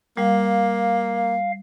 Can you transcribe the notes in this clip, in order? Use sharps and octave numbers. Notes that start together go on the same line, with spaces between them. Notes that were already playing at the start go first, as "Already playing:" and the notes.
G3 A#3 F5